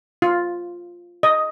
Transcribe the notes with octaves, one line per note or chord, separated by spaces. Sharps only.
F4
D#5